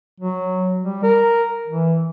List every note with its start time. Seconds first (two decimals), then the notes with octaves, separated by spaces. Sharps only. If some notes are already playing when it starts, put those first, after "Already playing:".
0.20 F#3
0.83 G3
1.03 A#4
1.68 E3